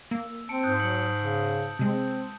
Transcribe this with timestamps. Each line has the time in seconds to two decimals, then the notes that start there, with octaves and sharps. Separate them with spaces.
0.11 A#3 E6
0.49 C4 A5 C#7 D7
0.63 G#2 D#6 F#6 G6
0.80 F#3 C#7 F#7
1.20 C#3
1.79 C3 G#3 C4